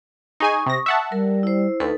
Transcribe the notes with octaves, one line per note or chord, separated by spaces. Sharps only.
D#4 G#4 G#5 C#6 D#6
C3 A#6
E5 F#5 A5
G3 A#4
E4 C5
D2 D#4 A4 B4